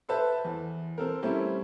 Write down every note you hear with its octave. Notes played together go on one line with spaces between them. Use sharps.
A4 B4 C5 E5 A5
E2
C4 A4 A#4
G3 A3 C4 C#4 E4